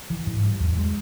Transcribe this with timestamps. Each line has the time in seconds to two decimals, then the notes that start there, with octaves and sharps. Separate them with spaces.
0.10 E3
0.27 G#2
0.43 G3
0.60 E2
0.77 G#3